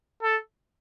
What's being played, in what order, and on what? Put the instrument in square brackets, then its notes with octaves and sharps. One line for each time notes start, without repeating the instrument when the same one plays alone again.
[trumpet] A4